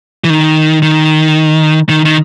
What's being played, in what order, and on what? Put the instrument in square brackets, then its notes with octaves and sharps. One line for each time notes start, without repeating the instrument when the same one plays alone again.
[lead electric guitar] E3
D#3
D#3
D#3
D#3